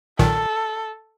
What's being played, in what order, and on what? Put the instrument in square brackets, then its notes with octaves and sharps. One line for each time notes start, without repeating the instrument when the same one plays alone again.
[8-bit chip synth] B1 A#2 D#3 [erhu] A4